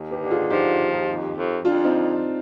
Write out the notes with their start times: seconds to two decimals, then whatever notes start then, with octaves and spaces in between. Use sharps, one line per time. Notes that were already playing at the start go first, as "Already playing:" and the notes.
Already playing: D#2
0.11 G4 B4
0.21 D3
0.31 F4 G#4
0.50 F3 D#4 G4
0.79 D#2
1.08 F2
1.37 F2
1.65 F2 D4 F4
1.84 C4 D#4